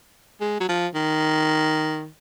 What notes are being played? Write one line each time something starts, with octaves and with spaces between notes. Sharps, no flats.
G#3
F#3
F3
D#3